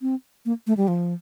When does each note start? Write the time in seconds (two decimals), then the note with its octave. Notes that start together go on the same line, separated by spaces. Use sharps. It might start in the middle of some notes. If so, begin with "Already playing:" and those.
0.02 C4
0.46 A#3
0.67 A3
0.77 G3
0.88 F3